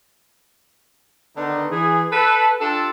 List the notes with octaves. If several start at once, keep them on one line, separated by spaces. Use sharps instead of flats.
D3 D#3 B3 D4 D#4
E3 G#4
A4 B4
D4 F4 G4 A4